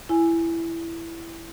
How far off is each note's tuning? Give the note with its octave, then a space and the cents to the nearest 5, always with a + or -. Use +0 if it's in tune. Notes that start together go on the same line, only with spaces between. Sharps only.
E4 +15 G#5 +0